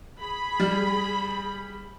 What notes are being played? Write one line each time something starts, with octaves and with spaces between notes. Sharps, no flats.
G#4 B5
G3